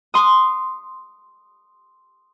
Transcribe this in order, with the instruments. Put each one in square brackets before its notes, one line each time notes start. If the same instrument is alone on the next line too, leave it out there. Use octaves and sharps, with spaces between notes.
[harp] C6 D#6